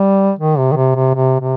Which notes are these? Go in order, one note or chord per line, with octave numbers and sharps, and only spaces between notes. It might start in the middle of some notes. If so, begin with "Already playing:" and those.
Already playing: G3
D#3
C3
D#3
C3
C3
C3
C3